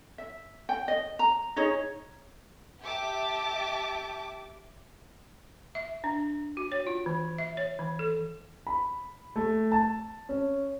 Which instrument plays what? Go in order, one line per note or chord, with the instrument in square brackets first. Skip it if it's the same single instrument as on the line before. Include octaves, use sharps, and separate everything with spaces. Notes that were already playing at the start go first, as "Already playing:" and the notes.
[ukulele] E5
G5
D#5
A#5
D#4 G#4 C#5 D#5
[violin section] G4 E5 A5 D6
[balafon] E5
D4
F#4
C#5
F4
E3
E5
C#5
E3
A4
[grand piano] B5
A3
A5
C#4